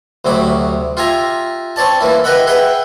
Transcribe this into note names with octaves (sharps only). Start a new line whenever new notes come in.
D2 C3 F#3 B5 D6
F4 G4 E5 G#5 A#5
C4 C#5 D5 A5
E3 A#3 E4
G4 B4 D#5 E5 F#5 B5
G#4 B4 E5 F#5 G5